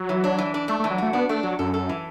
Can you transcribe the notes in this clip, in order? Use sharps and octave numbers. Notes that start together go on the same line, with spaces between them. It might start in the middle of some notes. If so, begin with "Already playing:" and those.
Already playing: F#3
E3
D4
E3
D4
A3 D4
A3
E3
F#3
A3 F#4
B3 D4
A3 D4
F#3 F#4
F#2 A4
A4
E3